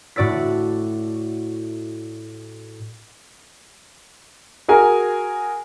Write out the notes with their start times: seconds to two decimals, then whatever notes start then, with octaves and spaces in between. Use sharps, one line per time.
0.16 A2 F#4 D5 E6 B6
4.68 F#4 G#4 A#4 G#5